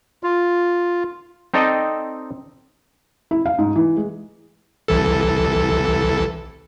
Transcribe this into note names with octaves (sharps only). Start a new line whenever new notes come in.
F4
C4 D#4 A4 D5 D#5 G5
E4
F5
G#2
E3
G#3
C2 E3 A4